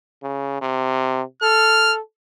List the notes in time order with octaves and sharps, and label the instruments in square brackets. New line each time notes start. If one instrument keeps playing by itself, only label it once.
[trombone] C#3
C3
[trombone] A4 [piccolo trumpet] F6